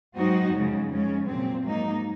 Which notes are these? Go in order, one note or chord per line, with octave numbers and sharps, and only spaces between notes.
G#2 F#3 C4 D#4 F#4
F2 C#3 G#3
F2 C#3 G#3 C#4
A#2 F#3 C4
G#2 F#3 A#3 D#4